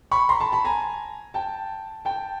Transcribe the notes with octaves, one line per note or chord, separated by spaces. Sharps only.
B5 C#6
A#5 C6
A5 B5
A5 B5
G#5 A#5
G5 A5
G5 A5